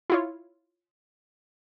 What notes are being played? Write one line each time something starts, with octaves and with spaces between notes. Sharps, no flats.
E4 F4 C#5